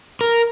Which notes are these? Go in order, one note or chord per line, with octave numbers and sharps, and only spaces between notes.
A#4